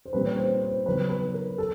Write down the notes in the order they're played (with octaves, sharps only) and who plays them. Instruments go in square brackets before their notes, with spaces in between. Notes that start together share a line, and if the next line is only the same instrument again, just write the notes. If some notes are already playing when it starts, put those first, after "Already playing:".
[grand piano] C5
A#2 G3 C4 B4
C#5
C5
C5
C#3 F#3 B3 B4
B4
A#4
A4